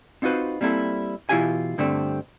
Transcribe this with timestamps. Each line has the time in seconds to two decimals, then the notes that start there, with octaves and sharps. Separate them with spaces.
0.22 C4 D#4 F4 F#4 B4 C5
0.61 G3 A#3 C4 E4 A4
1.29 B2 E3 E4 F4 G4 G#5
1.78 G2 D3 G3 A3 C4